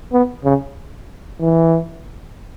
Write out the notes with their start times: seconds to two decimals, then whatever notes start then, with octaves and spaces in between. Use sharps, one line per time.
0.12 B3
0.44 C#3
1.40 E3